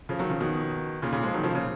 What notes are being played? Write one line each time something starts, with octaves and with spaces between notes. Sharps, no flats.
C#3 F3
D#3 F#3
C#3 F3
B2 D#3
A#2 C#3
A#2 C#3
F3 G#3
D#3 F#3
C#3 F3
A#2 C#3